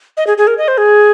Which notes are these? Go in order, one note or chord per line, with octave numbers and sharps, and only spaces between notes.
D#5
G#4
G#4
A#4
D#5
C5
G#4